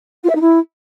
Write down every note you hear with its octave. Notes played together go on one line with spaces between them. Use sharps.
F4
E5
D#4
E4